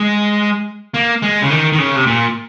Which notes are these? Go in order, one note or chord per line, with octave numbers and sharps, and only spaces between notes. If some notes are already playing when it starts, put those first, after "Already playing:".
Already playing: G#3
A#3
G#3
C#3
D#3
D#3
C#3
C3
A#2